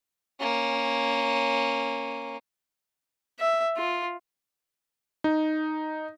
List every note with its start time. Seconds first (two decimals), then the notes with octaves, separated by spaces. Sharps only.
0.40 A#3 C#4
3.40 E5
3.77 F4
5.24 D#4